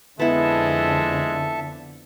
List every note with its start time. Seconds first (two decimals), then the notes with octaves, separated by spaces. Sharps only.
0.20 F2 D3 G#3 B3 E4 A4 E5 A5